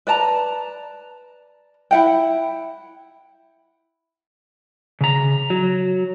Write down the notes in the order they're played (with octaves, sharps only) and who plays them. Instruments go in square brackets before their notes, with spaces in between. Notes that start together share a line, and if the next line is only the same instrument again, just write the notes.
[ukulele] B4 D5 A5 A#5
E4 F#5 G5
[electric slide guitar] C#3 A#5
F#3